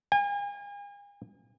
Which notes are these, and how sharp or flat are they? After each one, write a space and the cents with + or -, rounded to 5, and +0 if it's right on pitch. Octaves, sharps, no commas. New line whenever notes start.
G#5 -40